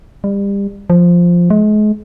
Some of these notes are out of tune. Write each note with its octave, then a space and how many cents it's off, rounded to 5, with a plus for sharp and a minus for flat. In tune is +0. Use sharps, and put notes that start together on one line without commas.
G3 +30
F3 +0
G#3 +35